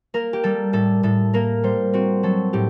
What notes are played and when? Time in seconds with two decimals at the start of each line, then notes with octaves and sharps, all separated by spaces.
0.14 A#3 A#4
0.33 G4
0.43 G3 A4
0.73 A2 A4
1.03 A2 A4
1.33 A#3 A#4
1.63 G3 C5
1.93 C4 F#4
2.23 F#3 A4
2.53 A2 G4